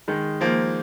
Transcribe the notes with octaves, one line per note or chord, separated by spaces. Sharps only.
D#3 G#3
F3 A#3